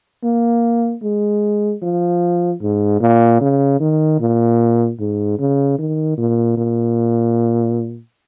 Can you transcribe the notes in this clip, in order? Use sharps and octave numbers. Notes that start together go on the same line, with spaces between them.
A#3
G#3
F3
G#2
A#2
C#3
D#3
A#2
G#2
C#3
D#3
A#2
A#2